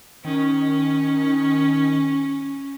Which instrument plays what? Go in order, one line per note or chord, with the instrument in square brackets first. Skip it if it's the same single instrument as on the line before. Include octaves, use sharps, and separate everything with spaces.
[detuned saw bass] D#3 [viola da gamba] C#4